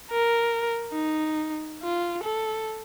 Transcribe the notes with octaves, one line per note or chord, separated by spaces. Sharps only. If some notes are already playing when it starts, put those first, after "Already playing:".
A#4
D#4
F4
A4